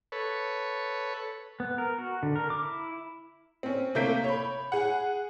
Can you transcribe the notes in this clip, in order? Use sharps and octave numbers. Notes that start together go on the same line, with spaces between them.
A4 B4 C#5
B3
A#4
F#4
D3
A#4
D6
E4
C4 C#4
C3 A3 A#3 G6 B6 D7
C#5 B5
G#4 F#5